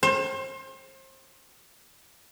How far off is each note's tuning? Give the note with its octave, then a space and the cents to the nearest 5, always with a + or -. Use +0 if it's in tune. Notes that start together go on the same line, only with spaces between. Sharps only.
C5 +35